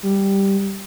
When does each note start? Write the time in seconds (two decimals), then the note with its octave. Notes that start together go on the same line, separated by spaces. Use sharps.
0.03 G3